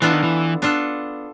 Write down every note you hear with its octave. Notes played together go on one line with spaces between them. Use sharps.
E3 B3 D4 F4 A4
D#3
E3
B3 D4 F4 A4